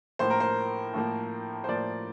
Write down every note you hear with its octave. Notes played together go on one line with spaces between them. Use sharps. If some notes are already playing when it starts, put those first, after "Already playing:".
A2 F3 A#3 C5
A#4
C5
A2 F3 A#3
C5
A2 F3 A#3 D5